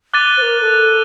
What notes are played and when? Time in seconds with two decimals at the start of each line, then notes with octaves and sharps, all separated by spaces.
0.14 D6 F#6 A6 D#7 G7
0.37 C5
0.42 A#4
0.61 A4